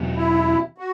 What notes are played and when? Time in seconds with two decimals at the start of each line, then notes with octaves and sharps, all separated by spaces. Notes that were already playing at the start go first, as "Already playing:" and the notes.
Already playing: E2 B2 F#3
0.16 E4
0.78 F#4